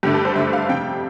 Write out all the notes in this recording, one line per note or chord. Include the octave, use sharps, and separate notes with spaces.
G2 D3 A3 G4
A4
C5
G2 D3 A3 E5
F5
F2 C3 G3 G5